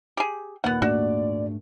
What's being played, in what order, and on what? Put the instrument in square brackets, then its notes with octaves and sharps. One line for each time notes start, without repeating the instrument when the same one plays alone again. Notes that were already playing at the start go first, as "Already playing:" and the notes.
[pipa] G4 G#4
[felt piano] D#2 A#2 [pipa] B3 F#5
[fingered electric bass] G#2 A3 D4 [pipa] F#4 [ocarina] D5